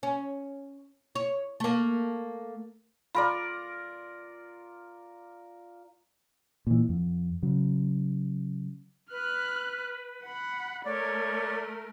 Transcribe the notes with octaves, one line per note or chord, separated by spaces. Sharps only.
C#4
C#5
A3 A#3
F4 A#4 D5 B5
A#2 E3
F2
C#3 F#3
B4 F6 F#6
F#5 B5
A3 A#4 C#5 D5